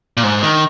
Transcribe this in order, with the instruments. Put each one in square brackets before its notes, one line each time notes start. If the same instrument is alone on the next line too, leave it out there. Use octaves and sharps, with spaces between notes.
[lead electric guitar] A#2
G#2
D#3